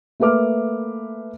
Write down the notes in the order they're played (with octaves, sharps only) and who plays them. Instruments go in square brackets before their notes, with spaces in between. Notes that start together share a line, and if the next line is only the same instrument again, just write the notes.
[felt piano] A3 A#3 B4 E5 D6 F6